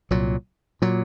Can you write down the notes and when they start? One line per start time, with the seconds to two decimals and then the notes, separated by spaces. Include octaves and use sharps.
0.11 C2 A#2 F#3
0.82 A#2 F#3